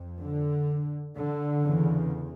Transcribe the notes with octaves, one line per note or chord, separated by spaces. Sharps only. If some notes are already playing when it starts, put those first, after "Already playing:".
Already playing: F2
D3
D3
E2 C#3